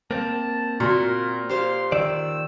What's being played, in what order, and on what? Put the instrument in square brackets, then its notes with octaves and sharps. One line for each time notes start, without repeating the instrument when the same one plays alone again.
[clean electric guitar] A#3 C4 [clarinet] A5
[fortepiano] A#2 [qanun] F#4 [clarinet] A#4
[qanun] G4 C5 F5 [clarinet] C6
[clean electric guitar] D#3 D5 [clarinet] E6